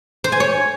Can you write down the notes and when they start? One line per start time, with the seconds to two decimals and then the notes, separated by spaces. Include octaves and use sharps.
0.24 C5
0.32 G#5
0.40 C#5